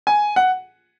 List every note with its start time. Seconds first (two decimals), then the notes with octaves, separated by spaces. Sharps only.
0.07 G#5
0.36 F#5